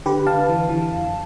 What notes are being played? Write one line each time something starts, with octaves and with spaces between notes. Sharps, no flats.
D3 G4 B4
D3 F5 A5
E3
E3
F2